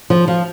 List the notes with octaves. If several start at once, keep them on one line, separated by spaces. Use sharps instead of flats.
F3
F3